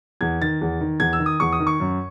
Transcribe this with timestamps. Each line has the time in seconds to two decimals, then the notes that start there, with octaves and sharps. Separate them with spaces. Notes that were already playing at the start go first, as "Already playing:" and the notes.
0.21 E2 G#6
0.42 D#3 A6
0.61 E2
0.81 D#3
1.00 E2 G#6
1.13 E6
1.19 D#3
1.26 D#6
1.40 E2 C#6
1.52 D#6
1.60 D#3
1.67 C#6
1.80 F#2